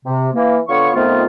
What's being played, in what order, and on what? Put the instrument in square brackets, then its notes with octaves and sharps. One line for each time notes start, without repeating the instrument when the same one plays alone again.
[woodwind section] C3
E3 A#3
D3 B3 F4 C#5 C#6
F2 D#3 F3 A3 B3 F4